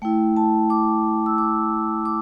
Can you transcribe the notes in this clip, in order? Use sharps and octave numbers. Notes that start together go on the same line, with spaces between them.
A3 E4 G5
A5
D6
E6
D6
D6